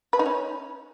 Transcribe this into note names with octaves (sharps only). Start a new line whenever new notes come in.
B4
D#4
C#4